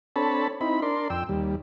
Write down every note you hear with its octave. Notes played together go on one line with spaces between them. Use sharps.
C4 D4 A4 C#5 A5 B5
C4 D#4 E4 B5
D4 A#4 D5 C6
F2 G5 E6
D#2 G3